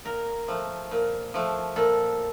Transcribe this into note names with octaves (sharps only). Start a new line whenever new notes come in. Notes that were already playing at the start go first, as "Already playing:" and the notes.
A#2 A#4
F3 A3
A#2
F3 A3
A#2 A4